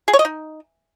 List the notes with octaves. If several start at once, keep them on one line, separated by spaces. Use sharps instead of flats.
G#4
C#5
D#5
D#4